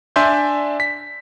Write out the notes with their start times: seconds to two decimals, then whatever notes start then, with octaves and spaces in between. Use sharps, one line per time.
0.16 D4 D5 E5 G#5 C6 G6
0.80 B6